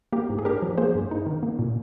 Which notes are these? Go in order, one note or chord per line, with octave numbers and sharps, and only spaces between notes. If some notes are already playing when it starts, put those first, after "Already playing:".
A#3 G4 A#4
G#2
G#4
D4 G4 A#4
F3
A#3 G#4 C5
G2
D#4
D#3
A#3
A#2